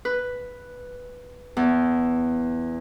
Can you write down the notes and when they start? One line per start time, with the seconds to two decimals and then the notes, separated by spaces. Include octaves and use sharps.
0.05 B4
1.57 E2